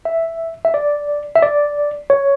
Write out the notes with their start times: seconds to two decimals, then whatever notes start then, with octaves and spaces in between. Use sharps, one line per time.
0.05 E5
0.65 E5
0.74 D5
1.36 E5
1.42 D5
2.10 C#5